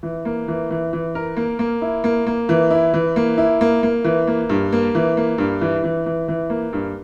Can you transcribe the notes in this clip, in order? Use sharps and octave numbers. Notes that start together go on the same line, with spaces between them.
E3
A#3
E3
E3
E3
A#4
A#3
A#3
E4
A#3
A#3
E3
E4
E3
A#3
E4
A#3
A#3
E3
A#3
G2
A#3
E3
A#3
G2
E3
E3
E3
E3
A#3
G2